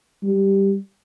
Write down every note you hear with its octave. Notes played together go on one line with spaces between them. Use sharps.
G3